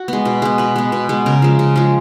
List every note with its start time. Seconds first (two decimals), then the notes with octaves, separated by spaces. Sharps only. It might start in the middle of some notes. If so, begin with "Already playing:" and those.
Already playing: F#4
0.08 G#3 B3
0.25 B2
0.42 G#3 B3
0.58 B2 B4
0.76 G#3 B3
0.92 B2
1.09 G#3 B3
1.26 C#3 A#4
1.42 F3 G#3
1.59 C#3
1.76 F3 G#3